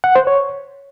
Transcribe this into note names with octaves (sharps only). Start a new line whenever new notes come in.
F#5
C5
C#5